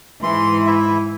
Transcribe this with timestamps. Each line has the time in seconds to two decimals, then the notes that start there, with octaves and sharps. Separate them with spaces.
0.23 G#2 E3 C6
0.66 E4 E5